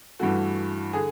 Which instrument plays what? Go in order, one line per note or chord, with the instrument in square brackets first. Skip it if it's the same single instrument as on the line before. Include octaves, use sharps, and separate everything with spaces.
[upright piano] G2 E3 A3 F#4
D3 G#4